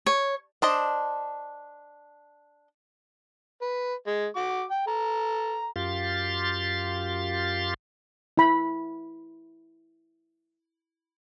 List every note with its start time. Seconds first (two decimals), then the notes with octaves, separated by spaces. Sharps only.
0.06 C#5
0.62 D4 C5 D#5
3.61 B4
4.07 G#3
4.36 F#4 D6
4.71 G5
4.87 A4 A#5
5.76 F#2 F4 G4 F5 C6 A6
8.38 E4 B5